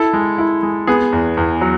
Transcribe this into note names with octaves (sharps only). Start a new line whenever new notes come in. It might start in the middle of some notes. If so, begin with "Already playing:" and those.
Already playing: E4 A4
G#3
E4
G#3
B3 G#4
E2
E2
F#3